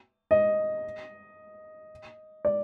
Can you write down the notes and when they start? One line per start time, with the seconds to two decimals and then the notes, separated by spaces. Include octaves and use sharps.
0.31 D#5
2.45 D5